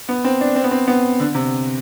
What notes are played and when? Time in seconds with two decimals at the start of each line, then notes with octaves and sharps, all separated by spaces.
0.09 B3
0.24 C4
0.41 D4
0.56 C4
0.64 B3
0.71 C4
0.88 B3
1.20 D3
1.35 C3